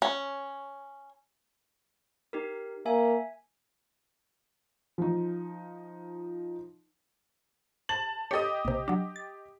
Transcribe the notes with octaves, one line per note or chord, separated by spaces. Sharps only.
C#4
D#4 G4 A#4
A#3 E5 G#5
F3 D#4
A5 A6 F#7
G4 A4 C#5 D#5 D#6
A#1 C3
F#3 D4
A6